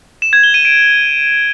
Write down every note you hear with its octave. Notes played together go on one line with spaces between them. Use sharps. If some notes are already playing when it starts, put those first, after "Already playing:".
E7
G#6
G7
D#7
D7